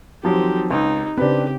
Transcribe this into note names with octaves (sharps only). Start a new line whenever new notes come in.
D#3 F3 F#3 C4 G4
C#2 D#4
C#3 C4 D4 G4 B4